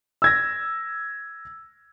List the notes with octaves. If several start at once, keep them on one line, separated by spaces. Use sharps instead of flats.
E6 G#6 A#6